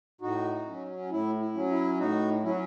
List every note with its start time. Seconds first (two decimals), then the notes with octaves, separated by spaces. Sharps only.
0.21 A2 D#4 F#4
0.66 F#3 C#4
1.10 A2 E4
1.40 E4
1.54 F#3 C#4
1.70 E4
1.98 A2 D#4 F#4
2.42 F#3 C#4 E4
2.50 F#4